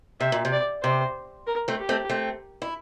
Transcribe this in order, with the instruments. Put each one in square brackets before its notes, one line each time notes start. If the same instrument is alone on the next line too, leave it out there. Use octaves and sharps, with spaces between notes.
[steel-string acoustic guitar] C3 [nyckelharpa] E5
[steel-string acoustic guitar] A#2
C3
[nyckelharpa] D5
[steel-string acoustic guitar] C3 [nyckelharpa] C5
[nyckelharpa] A#4
[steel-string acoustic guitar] A3 C4
[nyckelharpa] G4
[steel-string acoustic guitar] A3 C4
A3 C4
E4